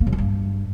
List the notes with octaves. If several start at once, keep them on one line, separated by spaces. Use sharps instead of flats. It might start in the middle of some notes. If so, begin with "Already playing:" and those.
A#3
F#2
D3
G2